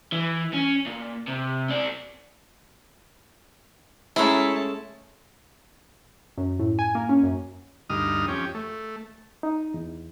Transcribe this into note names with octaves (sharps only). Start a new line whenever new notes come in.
E3
C#4
A#2
C3
C4 D5
F#3 G#3 A3 C#4 E4 A4 A5
F#2
A2
G#5
A#3
C#4
F#2
D2 G2 D#4 D#6 F6
F2 C#4 G4
A3
D#4
E2